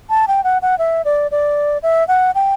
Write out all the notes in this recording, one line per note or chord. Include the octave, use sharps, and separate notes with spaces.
A5
G5
F#5
F#5
E5
D5
D5
E5
F#5
G5